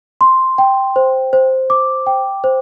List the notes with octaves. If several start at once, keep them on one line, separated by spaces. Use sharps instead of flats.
C6
G5
C5
C5
D6
G5
C5